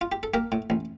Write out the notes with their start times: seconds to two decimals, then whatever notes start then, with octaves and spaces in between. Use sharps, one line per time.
0.01 F4
0.12 G4
0.23 A4
0.34 A#3 G4 A#4
0.52 A2
0.70 A1